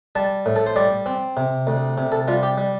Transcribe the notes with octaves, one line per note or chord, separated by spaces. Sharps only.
G3 A5
A2
A4
C5
G3 D5
C4
C3
D2
C3
A4
G3 F4
G4
G3